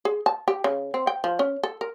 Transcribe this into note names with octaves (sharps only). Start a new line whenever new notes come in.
G#4
A5
G4
C#3
C4
G5
F3
C#4
A4
A#4